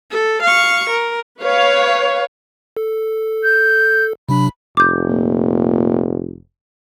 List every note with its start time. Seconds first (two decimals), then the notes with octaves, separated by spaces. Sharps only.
0.11 A4
0.43 F5 C#6
0.90 A#4
1.41 B4 C#5 F5
2.77 A4
3.43 G6
4.29 C3 F#3 D4 B5
4.77 F1 D6 G6
5.09 A#2